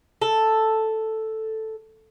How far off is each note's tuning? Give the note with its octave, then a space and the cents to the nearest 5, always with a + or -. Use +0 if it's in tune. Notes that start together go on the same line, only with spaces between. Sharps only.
A4 +0